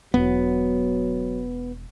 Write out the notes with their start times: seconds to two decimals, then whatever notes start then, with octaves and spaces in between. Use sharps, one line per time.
0.14 E1 F#3 B3